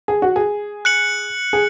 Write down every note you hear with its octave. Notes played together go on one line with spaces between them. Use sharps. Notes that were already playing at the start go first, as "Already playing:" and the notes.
G#4
F#4
G#4
F#6 C#7 F#7
G#4